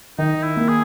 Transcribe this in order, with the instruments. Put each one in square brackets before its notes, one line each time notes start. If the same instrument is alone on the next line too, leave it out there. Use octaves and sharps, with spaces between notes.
[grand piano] D#3 [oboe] D#4
[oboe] E4
[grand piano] A#3
[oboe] G#4